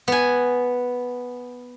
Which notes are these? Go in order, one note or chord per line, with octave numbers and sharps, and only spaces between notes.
B3 G#5